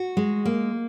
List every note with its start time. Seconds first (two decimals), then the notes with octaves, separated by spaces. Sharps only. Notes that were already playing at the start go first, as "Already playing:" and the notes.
Already playing: F#4
0.17 G#3
0.46 A#3